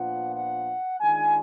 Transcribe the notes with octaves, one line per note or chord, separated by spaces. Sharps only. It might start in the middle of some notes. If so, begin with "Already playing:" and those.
Already playing: A#2 F3 B3 D4 F4 F#5
F#5
D#3 G#3 D4 F4 G#5